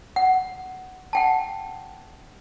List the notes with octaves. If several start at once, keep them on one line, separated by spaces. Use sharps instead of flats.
F#5
F#5 G5 A5